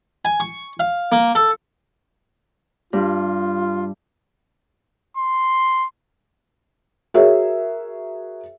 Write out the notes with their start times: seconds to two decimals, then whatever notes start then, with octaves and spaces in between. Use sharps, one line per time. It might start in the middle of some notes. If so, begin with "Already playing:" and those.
0.25 G#5
0.40 C#6
0.80 F5
1.12 A#3
1.35 A4
2.93 G2 F4
5.17 C6
7.14 F#4 G#4 A#4 C#5 E5